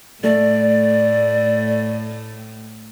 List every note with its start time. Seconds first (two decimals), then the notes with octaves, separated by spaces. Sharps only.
0.24 A2 A3 D5